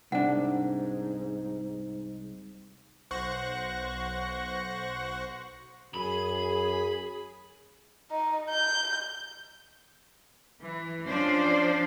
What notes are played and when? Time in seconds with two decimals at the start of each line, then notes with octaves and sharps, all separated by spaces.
0.12 C2 G#2 D4 F#5
3.11 B1 C5 F#5 C#6 A#6
5.94 F#2 G#4 B5
8.11 D#4
8.50 G6
10.61 E3
11.07 F3 C#4 D4 C5 D5